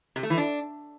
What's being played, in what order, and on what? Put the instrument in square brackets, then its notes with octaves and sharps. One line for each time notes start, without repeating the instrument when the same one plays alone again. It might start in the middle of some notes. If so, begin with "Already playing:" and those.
[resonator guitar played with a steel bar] C3
A3
E3
D4